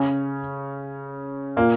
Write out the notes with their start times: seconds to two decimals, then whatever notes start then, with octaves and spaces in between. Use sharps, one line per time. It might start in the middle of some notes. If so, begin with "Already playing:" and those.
Already playing: C#3 C#4
1.57 A#2 A#3